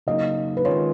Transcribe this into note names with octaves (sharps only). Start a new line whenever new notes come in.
C#3 F#3 A#3 D#4 D#5
B4
D#3 G#3 C#4 F4 C#5